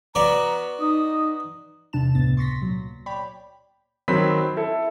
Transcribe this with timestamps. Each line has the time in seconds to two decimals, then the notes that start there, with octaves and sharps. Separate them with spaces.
0.15 B3 F#4 D5 A#5
0.80 D#4 D#6
1.93 E2 C3 D4 A5 E7
2.15 C#2 A2 C3 B3 A6
2.37 C6 C#6 A#6 B6
2.62 A#2 F#3
3.06 C#5 D5 G5 B5
4.08 D#3 F#3 C4 B5 B6
4.57 E4 A4